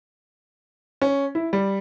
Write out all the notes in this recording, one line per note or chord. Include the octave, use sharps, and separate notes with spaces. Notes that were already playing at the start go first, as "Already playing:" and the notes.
C#4
E4
G3